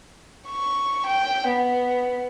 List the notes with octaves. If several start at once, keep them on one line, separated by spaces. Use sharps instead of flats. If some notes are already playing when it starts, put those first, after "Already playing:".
C#6
G5
B3